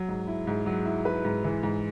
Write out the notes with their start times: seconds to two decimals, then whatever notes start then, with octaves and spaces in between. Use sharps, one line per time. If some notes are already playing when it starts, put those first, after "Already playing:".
Already playing: F#3
0.09 G#2
0.27 E4
0.47 G#2
0.66 F#3
0.85 E4
1.05 B4
1.25 G#2
1.44 E3
1.63 G#2